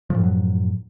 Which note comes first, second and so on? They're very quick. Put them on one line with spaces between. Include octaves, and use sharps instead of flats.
F3 A2 F#2 F#3